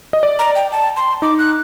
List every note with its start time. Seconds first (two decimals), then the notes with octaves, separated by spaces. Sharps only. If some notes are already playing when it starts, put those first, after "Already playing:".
0.13 D#5
0.23 D5
0.39 A#5
0.55 G5
0.72 A5
0.97 C6
1.22 D#4 D6
1.39 F#6